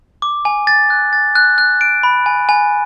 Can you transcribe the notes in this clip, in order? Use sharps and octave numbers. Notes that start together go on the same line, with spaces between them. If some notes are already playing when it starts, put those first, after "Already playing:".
D6
G#5
A6
F#6
A6
F#6
F#6
D7
B5
G#5
G#5